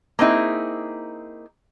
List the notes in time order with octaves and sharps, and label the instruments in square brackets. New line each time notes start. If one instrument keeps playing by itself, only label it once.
[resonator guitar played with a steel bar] A#3 C4 D#4 E4 G#4